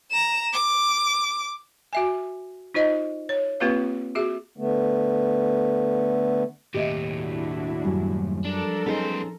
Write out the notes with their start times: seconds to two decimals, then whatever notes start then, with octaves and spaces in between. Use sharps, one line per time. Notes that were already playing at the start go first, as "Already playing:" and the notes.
0.11 A#5 E7
0.53 D6
1.93 F#4 E5 G#5
2.74 D#4 F4 C5 D#5
3.29 C#5
3.60 A#3 C4 F4 G4 B4 F5
4.15 F#4 G#4 E5
4.58 D3 A3 B3
6.74 D#2 A2 G4 D#5 E5
7.05 D4 E4 F#4
7.85 F#2 F#3 G3
8.45 F3 D4 A4 A#4
8.86 B3 C#4 D#4 G#4 C5